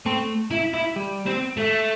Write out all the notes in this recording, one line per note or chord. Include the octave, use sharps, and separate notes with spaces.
A3 C4
E4
E4
G3
C4
A3